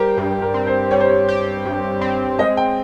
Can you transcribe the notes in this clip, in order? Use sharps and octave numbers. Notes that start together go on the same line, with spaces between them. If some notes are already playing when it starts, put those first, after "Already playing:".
Already playing: G3 G4 A#4 C5
G2 A#4
A#4
C4
C5
G3 C#5
C5
C#5
G4
G2
C4
G#3 D#5
G5